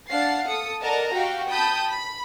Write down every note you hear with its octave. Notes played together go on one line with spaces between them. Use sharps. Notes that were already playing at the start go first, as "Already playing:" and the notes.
D4 F5 F#5 A6 C7
A4 D#6 C#7
A#4 D5 D#5 F#5 A5 A#5
F#4 G4 F5 G5
G5 A5 B5 D#6 G6
B5